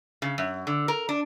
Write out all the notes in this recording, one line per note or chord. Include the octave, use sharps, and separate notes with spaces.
C#3
F#2
D3
A#4
D4